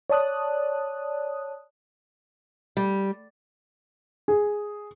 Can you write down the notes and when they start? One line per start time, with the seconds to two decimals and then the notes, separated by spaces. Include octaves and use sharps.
0.10 C#5 D5 A5 D#6 F#6
2.77 G3
4.28 G#4